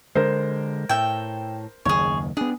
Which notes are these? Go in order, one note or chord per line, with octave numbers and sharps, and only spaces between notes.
D3 G#3 A#4 C5
A2 E5 G5
F#1 D#2 G#4 C#5
B3 D4 G#4